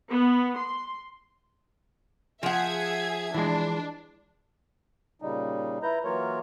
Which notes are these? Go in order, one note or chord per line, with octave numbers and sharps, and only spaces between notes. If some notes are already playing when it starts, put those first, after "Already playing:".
B3
C6
F3 G#4 E5 F#5 G#6
E3 G#3 D4
A#2 C#3 G3 D#4
E4 B4 A#5 G6
E3 F#3 A#3 F4 A#4 C#5